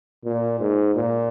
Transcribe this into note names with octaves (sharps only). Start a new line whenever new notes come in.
A#2
G#2
A#2